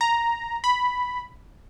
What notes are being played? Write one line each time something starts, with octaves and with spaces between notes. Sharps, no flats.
A#5
B5